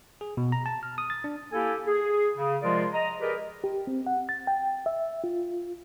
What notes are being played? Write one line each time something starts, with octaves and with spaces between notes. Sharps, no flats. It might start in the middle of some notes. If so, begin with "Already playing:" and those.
G#4
B2
A#5
A5
F6
D#6
A6
D4
A#3 E4 G4 A4 G#5
G#4
C#3
C3 F3 G#3 F4 A#4 D5
D#5 A#5
G4 G#4 A#4 B4 D5 D#5
G4
C4
F#5
A6
G5
E5
F4